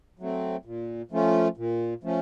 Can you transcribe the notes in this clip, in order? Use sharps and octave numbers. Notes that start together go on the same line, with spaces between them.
F#3 A3 C4
A#2
F3 A3 C#4 F4
A#2
F3 A3 C#4